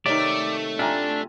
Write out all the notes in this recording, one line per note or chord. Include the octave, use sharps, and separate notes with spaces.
C3 D#3 A3 C#5 D5
D4 F4 G4 E5 G5 G#5 A#5